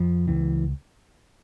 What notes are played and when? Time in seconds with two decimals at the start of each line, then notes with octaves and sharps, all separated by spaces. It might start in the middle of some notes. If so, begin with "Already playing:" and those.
Already playing: F2 F3
0.27 C#2 E3